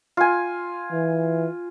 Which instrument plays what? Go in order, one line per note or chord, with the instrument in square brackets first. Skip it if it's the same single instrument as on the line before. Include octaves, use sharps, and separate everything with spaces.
[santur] F4 G#5
[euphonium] E3